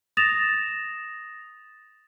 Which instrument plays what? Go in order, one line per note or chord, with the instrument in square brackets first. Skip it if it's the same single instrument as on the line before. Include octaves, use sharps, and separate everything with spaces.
[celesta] D#6 A6 A#6 E7 F7